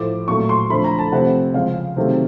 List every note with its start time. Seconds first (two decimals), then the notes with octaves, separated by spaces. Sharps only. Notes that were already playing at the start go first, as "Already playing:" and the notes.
Already playing: A2 F3 A3 D6
0.28 A#2 F#3 A3 C#6
0.49 C6
0.70 D3 F3 A3 B5
0.84 A#5
0.98 A5
1.12 C3 F3 A3 F#5
1.54 C#3 F3 G#3 F5
1.97 C3 D#3 F#3 A3